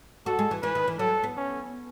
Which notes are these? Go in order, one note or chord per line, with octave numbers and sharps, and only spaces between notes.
F#4 A4
G#3
E3
E3 B4
D#3
E3
F#3 A4
B3
C#4